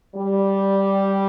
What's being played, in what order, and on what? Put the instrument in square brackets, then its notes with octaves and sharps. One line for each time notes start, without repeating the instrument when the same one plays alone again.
[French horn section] G3